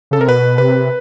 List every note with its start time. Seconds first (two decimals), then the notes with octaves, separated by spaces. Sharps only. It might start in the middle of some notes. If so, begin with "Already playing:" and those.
0.11 C#3 A4
0.19 C3 A#4
0.28 B2 B4
0.58 C3 B4